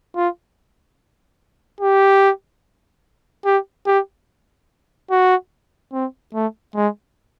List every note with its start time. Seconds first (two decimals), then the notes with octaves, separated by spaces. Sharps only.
0.16 F4
1.81 G4
3.45 G4
3.87 G4
5.11 F#4
5.93 C4
6.34 A3
6.75 G#3